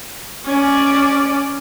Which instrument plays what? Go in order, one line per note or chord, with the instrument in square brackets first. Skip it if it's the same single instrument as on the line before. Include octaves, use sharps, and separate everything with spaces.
[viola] C#4 D5